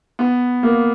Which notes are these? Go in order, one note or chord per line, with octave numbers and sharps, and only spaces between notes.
B3
A#3